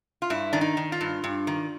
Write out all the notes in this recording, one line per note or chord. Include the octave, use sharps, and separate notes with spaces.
F4
G2 E4
D#3 D4
D#4
D#3
F4
G2
G2
D#3